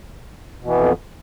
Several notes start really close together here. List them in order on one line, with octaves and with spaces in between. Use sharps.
B2 E3 B3 F2